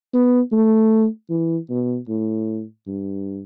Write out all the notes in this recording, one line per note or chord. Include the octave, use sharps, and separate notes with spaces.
B3
A3
E3
B2
A2
G2